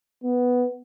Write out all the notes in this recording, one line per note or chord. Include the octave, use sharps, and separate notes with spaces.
B3